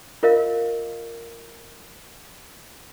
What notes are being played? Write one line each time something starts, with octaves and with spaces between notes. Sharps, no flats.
F4 A#4 D#5 F5